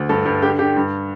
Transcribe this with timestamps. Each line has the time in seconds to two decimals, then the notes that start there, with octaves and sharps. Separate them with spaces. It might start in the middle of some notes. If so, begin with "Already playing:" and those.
Already playing: D2
0.09 G2 A4
0.25 G2
0.42 D3 G4
0.59 D3 G4
0.76 G2